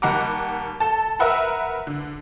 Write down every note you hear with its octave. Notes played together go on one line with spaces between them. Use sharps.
D#2 G3 F#5 A#5 D6
A4 A5
A#4 B4 E5 F#5 B5
D3